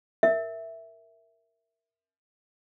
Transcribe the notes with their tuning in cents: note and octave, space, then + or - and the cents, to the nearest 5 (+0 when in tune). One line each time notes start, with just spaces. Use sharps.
A#4 +0 E5 +0